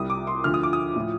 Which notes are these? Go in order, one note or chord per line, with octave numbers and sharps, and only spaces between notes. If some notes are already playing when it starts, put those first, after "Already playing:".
Already playing: C2 C3 G3 D#6
D6
C6
D2 D3 F3 F6
D#6
D6
D#6
A2 F3